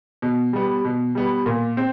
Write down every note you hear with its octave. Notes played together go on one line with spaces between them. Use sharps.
B2
G3 B3
B2
G3 B3
A#2
C4